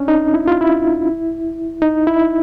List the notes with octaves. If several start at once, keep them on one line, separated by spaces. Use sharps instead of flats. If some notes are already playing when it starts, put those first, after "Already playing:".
Already playing: C#4 D4
D#4
E4
F4
E4
D#4
E4